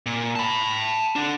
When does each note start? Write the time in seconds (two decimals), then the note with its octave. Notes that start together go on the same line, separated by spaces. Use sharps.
0.06 A#2
0.36 A5 B5
1.16 D3 D4